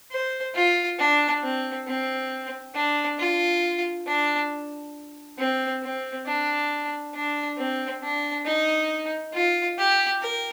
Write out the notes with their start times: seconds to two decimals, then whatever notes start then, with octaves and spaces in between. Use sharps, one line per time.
0.12 C5
0.55 F4
0.99 D4
1.43 C4
1.87 C4
2.75 D4
3.19 F4
4.07 D4
5.38 C4
5.83 C4
6.26 D4
7.14 D4
7.57 C4
8.03 D4
8.46 D#4
9.33 F4
9.78 G4
10.22 A#4